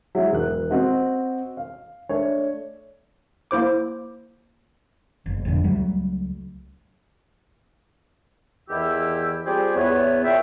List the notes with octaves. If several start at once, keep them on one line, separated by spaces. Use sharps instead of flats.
F#3 G#3 E4
E1 F#6
C4 F#4 D#5
F5
A3 D4 C#5
A#3 E4 C5 D6
F#1
A#1 F2 A2 D3
C#2 F#3 G3 A3
E2 D#3 E3 E4 G4 E6
G3 C4 F4 G4 G#4
E2 B3 C#5
A#2 E5 G5